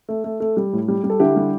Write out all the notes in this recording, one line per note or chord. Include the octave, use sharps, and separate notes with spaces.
A3
A3
A3
G3
A2
G3
G3
A4
D3 E4 G4
G3